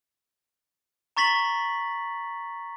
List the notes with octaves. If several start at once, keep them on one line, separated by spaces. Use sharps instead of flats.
A#5 C#6 A6 B6 F#7